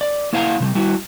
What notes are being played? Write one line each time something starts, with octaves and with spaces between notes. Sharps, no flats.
D5
A#3 E4 C5 F5 F#5 A#5
C3 F3 G3
G3 E4 F#4